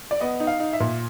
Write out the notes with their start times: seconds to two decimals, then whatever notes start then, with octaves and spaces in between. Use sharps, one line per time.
0.11 D5
0.21 B3 D#5
0.40 D#4
0.47 F5
0.60 D#4
0.73 E5
0.80 A#2